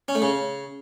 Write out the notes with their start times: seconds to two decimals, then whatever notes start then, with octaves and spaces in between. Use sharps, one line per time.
0.08 C#4
0.15 A3
0.22 C#3